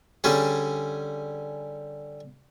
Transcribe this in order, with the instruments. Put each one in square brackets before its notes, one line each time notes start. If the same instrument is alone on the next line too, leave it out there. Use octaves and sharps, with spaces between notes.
[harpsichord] D3 G3 C#4 G#4